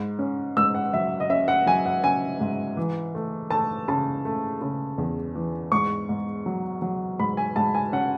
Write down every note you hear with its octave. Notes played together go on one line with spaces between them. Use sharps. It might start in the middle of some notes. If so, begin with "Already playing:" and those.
Already playing: G#2
C#4
G#2 E6
F#5
F#3 E5
D#5
C#4 E5
F#5
F#3 G#5
F#5
C#4 G#5
G#2
E3
A3
A3 A5
C#3 A5
A3
C#3
E2
E3
G#2 C#6
G#2
F#3
F#3
G#2 B5
G#5
G#2 A5
G#5
C#4 F#5